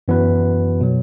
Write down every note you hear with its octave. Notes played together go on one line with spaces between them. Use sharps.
F#2 E3 B3 F#4 B4
B2 F#3